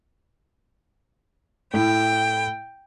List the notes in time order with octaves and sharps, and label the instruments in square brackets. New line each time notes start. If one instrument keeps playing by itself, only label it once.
[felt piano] A2 E4 [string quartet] G5